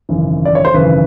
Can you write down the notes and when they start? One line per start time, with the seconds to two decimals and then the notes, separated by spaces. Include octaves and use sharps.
0.09 G#1 F#2 C#3 E3
0.45 D5
0.55 C#5
0.65 C5
0.74 G#1 F#2 C#3 E3 B4